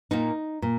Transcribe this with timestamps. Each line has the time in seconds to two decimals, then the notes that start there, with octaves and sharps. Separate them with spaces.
0.11 A#2 A#3 D#4
0.62 A#2